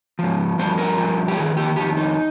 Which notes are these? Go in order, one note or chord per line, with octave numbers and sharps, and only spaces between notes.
G#2 F3
G2 F3 C5
A#4
G2 F3
G4
F2 D#3 G#4
G4
F2 D#3 G4
D#4